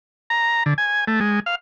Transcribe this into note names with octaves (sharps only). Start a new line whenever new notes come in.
A#5
D3
G#5
A3
G#3
F5